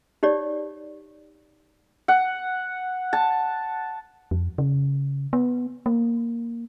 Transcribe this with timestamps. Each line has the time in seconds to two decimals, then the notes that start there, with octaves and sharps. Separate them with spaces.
0.23 D#4 G4 C#5 D5
2.08 F#5
3.13 A5
4.31 F2
4.58 C#3
5.33 B3
5.86 A#3